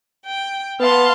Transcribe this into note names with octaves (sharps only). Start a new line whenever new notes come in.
G5
B3 F5 A5 C6